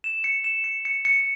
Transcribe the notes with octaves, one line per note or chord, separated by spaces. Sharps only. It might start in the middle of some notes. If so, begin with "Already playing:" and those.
E7
C#7
E7
C#7
C#7
C#7